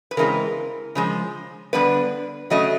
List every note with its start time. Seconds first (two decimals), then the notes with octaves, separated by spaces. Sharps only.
0.11 B4
0.17 C#3 E3 G#3 C4 A#4
0.95 C#3 F3 G#3
1.73 D3 G3 B3 D4 B4
2.50 C#3 F#3 A3 C#4 D#5